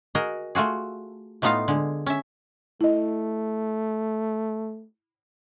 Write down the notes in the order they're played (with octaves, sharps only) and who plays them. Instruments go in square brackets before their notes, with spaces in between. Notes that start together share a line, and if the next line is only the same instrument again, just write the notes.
[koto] F#4 G#4 A#4 D#5
A3 F4 F#4 G#4
A2 A3 B3 D#4 F4 F5
D3 G#3
C#4 E5
[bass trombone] A3 [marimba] E4 D#5